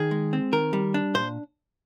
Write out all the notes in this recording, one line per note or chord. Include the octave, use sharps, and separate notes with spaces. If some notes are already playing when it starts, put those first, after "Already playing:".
Already playing: D#3 G#4
G#3
C4
D#3 A#4
G3
D4
A#2 C5